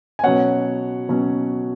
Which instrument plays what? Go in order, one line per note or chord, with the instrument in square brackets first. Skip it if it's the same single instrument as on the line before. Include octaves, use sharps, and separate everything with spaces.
[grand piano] G#5
B2 F#3 C#4 C#5 F#5
B2 F#3 C#4